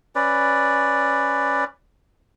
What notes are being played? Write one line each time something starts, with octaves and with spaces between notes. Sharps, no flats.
C#4 B4 D5